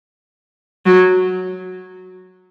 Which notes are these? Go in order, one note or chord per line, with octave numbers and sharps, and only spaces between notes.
F#3